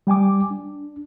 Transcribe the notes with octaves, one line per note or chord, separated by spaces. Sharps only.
G3 G5 G#5 D6
D4